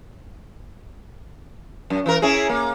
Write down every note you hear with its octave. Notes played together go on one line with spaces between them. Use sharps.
F#2
E3 A#4
C#4 E4 G#4
A#3